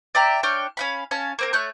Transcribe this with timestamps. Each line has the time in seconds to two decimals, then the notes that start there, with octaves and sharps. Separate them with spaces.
0.15 D5 E5 G5 A#5
0.43 D4 C#5 G5 F6
0.77 C#4 F5 B5
1.11 C#4 F5 A5
1.39 A#3 C4 A#4
1.53 A3 C#5 F#6 G6